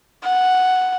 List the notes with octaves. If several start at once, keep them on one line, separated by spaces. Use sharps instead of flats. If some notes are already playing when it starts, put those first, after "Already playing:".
F#5